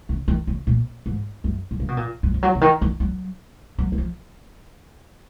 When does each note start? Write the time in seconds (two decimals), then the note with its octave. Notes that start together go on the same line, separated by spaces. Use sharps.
0.09 C#3
0.28 D#3
0.47 C#3
0.67 A#2
1.06 G#2
1.44 F#2
1.71 G#2
1.80 C#3
1.88 B2
1.97 A#2
2.23 G#2
2.34 F3
2.43 F#3
2.55 C#3
2.61 D#3
2.82 D#3
3.00 F#3
3.79 F#3
3.92 F#3
3.98 F3